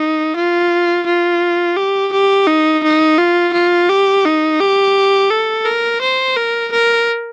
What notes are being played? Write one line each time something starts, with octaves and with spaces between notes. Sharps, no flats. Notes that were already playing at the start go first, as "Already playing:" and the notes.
Already playing: D#4
F4
F4
G4
G4
D#4
D#4
F4
F4
G4
D#4
G4
A4
A#4
C5
A#4
A#4